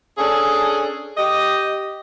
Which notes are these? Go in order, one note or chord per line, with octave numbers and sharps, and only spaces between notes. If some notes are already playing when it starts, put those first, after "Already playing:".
C#4 D4 G#4 A4
G4 D#5